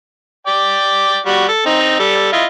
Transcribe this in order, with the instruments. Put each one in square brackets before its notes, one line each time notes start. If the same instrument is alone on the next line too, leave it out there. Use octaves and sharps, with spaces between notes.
[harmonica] D5 G5
G3 F#4
A4
C4 D#4
G3 A4
E4 F4 D#5